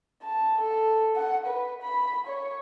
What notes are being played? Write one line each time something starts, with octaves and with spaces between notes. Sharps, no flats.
A5
A4
F#5
B4
B5
C#5